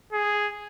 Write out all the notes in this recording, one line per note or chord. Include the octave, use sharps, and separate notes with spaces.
G#4